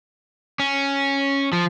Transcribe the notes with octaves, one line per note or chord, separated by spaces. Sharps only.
C#4
F3